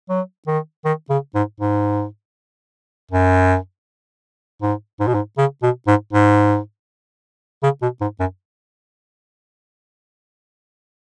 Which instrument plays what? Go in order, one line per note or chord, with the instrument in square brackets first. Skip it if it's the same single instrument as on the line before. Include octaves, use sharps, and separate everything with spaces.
[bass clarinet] F#3
D#3
D#3
C#3
G#2
G#2
F#2
G#2
G#2
B2
G#2
C#3
B2
G#2
G#2
C#3
B2
G#2
F#2